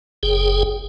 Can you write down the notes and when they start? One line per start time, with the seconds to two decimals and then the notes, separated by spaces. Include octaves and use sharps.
0.23 F#1 G#4 G5